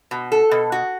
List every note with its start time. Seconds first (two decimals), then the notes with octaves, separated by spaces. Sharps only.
0.11 B2
0.32 A4
0.51 B2
0.72 F#4